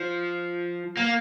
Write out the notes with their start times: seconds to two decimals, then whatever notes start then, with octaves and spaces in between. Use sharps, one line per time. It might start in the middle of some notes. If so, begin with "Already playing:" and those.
Already playing: F3
0.97 A#3